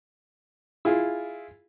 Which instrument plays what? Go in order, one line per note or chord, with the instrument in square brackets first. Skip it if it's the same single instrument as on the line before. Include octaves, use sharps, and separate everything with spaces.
[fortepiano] E4 F4 G#4